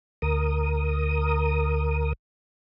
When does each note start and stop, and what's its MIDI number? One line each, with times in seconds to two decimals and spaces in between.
0.22 2.13 38
0.22 2.13 70
0.22 2.13 87